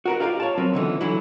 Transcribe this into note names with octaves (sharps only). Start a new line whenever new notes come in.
F#4 A#4 B4
F4 G4 A#4 D5 E5 F5
C#5 A5
F#3 C4 A#4 B4
C#2 D3 E3 B3
D3 E3 F#3 E4